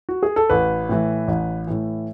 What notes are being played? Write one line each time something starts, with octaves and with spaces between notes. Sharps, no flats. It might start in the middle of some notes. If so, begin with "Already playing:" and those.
F#4
G#4
A4
A1 B4
A2 E3
A1
A2 E3